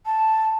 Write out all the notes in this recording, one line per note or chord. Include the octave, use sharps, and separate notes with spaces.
A5